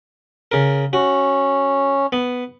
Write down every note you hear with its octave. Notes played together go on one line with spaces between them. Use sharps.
C#3 A#4
C#4 F#4
B3